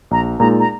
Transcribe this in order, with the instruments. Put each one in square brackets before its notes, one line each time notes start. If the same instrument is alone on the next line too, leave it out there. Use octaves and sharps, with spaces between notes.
[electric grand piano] A#1 [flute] A#5
[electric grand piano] A#2 G#3 D#4 [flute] A#5
[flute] A#5